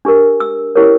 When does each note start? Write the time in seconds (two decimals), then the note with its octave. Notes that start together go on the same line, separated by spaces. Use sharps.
0.05 D4 G4 A#4
0.40 E6
0.75 C#4 E4 G4 A#4 C#5